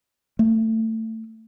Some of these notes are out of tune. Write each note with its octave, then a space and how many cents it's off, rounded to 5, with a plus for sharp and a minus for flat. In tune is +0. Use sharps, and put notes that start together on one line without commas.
A3 +20